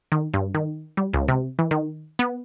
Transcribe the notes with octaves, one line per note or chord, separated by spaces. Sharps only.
D#3
G2
D#3
G3
C#2
C3
E3
D#3
B3